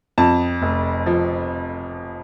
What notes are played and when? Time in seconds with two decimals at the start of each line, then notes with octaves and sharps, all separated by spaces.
0.18 F2 A5
0.62 F1
1.06 F3